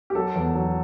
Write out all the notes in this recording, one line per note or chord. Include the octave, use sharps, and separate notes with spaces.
G4
F#3 A4
E2
F#3